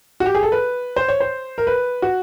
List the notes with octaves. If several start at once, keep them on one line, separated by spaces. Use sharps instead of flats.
F#4
G4
G#4
A4
B4
C5
C#5
C5
A#4
B4
F#4